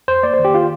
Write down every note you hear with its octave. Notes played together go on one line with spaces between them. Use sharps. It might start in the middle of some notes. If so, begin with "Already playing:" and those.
F2 C5
A#3 D5
C5
D#3
G4
F4